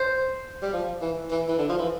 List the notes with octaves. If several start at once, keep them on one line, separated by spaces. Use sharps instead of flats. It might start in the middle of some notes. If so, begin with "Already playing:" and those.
Already playing: C5
G3
F3
E3
E3
E3
D3
F3
E3